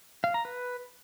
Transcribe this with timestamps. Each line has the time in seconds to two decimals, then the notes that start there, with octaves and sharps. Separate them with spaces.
0.24 F5
0.34 A#5
0.45 B4